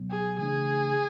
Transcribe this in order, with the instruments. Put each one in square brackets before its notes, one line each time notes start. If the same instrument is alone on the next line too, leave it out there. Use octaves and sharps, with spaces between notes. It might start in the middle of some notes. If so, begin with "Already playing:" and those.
Already playing: [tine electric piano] C#2 B2 F#3 B3
[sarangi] G#4
[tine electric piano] C#3 E3 A3 D4 [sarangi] G#4